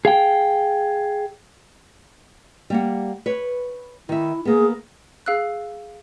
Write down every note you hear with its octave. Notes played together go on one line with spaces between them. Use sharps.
G#4 F5 G5
G3 A#3 F#5
B4 C#5
D#3 E4 E5
A#3 B3 G#4
G#4 F5 E6 F#6